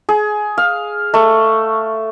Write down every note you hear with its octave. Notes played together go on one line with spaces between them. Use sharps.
G#4
F5
A3